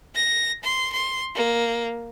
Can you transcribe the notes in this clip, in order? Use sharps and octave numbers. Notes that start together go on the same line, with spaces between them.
A#6
C6
C6
A#3